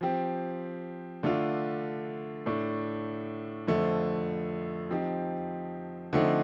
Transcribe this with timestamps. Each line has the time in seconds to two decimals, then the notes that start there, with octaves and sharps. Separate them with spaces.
0.01 F3 C4 G4
1.23 D3 A3 D4 F4
2.46 A2 A3 D4
3.67 F2 D3 F3 A3
4.90 F3 C4 D#4 G4
6.13 D3 F3 A3 C4 D#4